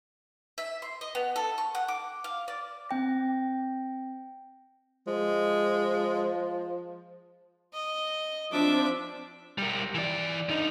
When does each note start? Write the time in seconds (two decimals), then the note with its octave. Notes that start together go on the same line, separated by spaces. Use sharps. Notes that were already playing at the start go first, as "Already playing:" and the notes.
0.58 E5
0.82 C6
1.01 D#5
1.15 B3
1.36 A4
1.58 C#6
1.75 F#5
1.88 D6
2.24 F5
2.48 D5
2.89 C4 G5 A#6
5.07 F3 G#3
7.73 D#5
8.52 F3 C4 D4 E5 D6
9.58 G3 A#4
9.95 E3 D5
10.49 D3 D#4